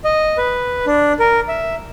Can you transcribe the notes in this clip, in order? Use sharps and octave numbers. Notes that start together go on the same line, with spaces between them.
D#5
B4
D4
A#4
E5